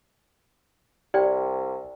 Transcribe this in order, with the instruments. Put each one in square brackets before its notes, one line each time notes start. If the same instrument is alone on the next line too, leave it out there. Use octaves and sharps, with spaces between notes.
[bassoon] C2 [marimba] G4 [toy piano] D5 G5